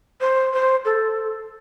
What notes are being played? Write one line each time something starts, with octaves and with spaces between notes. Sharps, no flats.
C5
C5
A4